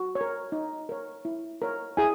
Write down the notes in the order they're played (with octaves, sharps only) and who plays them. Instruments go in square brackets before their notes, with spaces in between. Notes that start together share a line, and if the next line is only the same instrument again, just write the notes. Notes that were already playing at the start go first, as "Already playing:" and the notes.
Already playing: [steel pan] F#4
C#5
A#4
D#4
A#4 C#5
E4
A#4 C#5
E4 G#4 G#5